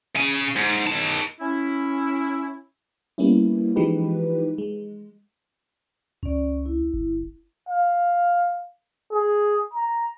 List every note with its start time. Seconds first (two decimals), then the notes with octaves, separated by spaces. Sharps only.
0.15 C#3 G#5
0.56 G#2
0.87 D#3 A5
1.40 C#4 E4
3.18 G3 A#3 B3 C#4 E4
3.76 E3 F3 G#3 D#4 G4 B4
4.58 G#3
6.23 C#2 C#4 D5
6.66 E4
6.94 G1
7.69 F5
9.12 G#4
9.74 A#5